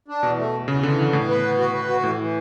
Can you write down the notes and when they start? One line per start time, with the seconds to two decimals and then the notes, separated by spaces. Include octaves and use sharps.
0.08 D4
0.23 E2 B2
0.38 A3
0.53 E2
0.68 E2 C#3
0.83 E2 D3
0.98 D3 E3
1.13 A2 B3
1.29 B4
1.43 B3
1.58 F#4
1.73 B4
1.89 F#4
2.03 A2 E3
2.19 E3